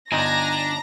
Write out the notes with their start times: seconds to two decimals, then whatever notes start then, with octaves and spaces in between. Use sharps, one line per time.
0.12 G1 D4 D#4 G#5 A#5 A#6